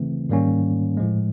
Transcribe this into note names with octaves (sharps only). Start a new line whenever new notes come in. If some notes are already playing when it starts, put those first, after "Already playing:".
Already playing: C#3 E3 A3 C4
G#2 D#3 G3 A#3 C#4
A2 F3 G#3